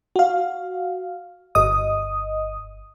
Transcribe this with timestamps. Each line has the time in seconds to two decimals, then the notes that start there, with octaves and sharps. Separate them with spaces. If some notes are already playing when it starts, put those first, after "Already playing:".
0.16 F#4 F5
1.55 G1 D#5 D#6